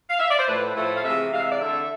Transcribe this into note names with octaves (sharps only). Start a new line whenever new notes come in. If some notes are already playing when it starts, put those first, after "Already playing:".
F5
E5
D5
C5
A2 F3 A3 B4
A2 F3 A3
F5
C3 E3 G#3 E5
C3 E3 G#3 F5
E5
D5
D3 A3 E5